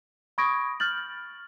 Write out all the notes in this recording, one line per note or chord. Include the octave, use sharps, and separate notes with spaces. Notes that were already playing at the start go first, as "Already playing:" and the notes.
B5 C#6 D#6 G#6 A#6 D7
F6 G6 A6 F#7